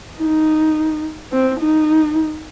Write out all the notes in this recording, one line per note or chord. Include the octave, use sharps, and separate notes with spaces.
D#4
C4
D#4